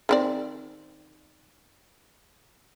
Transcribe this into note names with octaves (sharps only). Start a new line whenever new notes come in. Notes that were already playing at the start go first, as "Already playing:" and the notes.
D#3 C4 D5